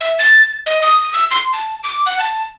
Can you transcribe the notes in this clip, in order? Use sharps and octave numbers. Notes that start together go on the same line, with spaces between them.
E5
A6
D#5
D#6
E6
C6
A5
D6
F#5
A5